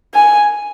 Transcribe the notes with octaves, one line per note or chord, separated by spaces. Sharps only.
G#5